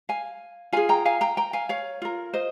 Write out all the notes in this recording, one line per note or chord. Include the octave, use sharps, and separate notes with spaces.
F5 G#5
F4 G#4 F5 G#5
G5 A#5
F5 G#5
G5 A#5
G5 A#5
F5 G#5
C#5 F5
F4 A#4
C5 D#5